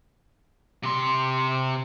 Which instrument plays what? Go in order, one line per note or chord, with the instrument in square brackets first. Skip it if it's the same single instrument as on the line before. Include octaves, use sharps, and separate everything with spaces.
[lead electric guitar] C3 C6